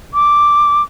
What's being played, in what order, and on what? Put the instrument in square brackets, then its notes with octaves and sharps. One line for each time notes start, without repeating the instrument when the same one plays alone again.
[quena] D6